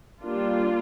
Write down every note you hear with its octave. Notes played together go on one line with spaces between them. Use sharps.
G3 A#3 D4 F4